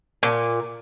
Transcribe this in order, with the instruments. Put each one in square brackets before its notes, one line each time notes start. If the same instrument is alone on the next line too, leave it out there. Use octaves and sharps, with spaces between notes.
[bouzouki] A#2